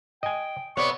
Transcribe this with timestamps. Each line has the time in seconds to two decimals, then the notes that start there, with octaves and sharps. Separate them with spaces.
0.23 D#5 G5 G#5
0.77 C3 B3 C#5 D5 C#6